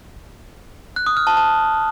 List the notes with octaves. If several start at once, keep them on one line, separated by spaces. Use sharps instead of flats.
F#6
D#6
F6
A5
A5